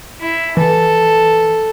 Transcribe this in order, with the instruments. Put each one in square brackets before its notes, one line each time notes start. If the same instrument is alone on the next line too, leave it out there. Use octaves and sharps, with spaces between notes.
[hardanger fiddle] E4
[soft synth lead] E3 [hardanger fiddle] A4